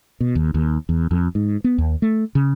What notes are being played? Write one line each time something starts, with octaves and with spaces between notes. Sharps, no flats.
B2
D#2
D#2
E2
F2
G#2
B3
D#2
A3
C#3